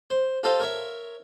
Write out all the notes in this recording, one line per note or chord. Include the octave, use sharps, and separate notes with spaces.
C5
F4 G4 A4 C5 D#5 F5
A#4 C#5 E5